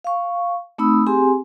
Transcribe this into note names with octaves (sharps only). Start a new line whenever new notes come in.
F5 C#6
A3 C4 D#4 B5 D#6 E6
C4 G4 G#4 G#5 C6